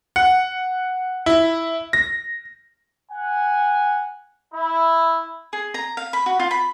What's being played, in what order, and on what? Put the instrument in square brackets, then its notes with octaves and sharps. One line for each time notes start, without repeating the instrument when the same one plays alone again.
[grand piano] F#5
E4
A#6
[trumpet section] F#5 G#5
E4
[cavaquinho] G#4
A#5
F5
B5
F#4
F4
B5